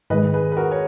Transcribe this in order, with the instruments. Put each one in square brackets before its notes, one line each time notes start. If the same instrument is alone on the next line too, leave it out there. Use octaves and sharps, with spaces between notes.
[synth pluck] G#2 D#3 G#3 [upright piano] B4 D#5
[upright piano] G#4 B4
B4
F#4 A#4
C#5